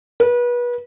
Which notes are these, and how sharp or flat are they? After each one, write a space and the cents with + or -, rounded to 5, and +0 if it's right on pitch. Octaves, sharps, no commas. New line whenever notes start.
B4 -30